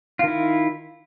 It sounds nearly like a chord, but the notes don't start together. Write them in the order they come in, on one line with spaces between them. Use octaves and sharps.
F4 D#3 E4